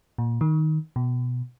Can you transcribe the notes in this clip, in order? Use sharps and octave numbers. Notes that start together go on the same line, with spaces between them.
A#2
D#3
B2